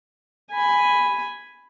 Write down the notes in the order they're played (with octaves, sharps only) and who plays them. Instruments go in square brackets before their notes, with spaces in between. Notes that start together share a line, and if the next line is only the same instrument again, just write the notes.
[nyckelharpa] G#5 B5